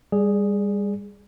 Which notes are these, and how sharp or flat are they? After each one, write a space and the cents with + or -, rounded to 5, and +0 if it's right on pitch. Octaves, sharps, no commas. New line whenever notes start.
G3 +35 G#4 +0 D5 +0